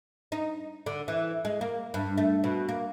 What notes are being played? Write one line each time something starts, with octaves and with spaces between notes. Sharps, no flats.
D#4
D3
E3
G#3
A#3
G2
A3
B2
A#3